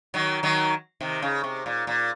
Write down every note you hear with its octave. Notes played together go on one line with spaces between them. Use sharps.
D#3 F#3
D#3 F#3
C3 D#3
C#3
C3
A#2
A#2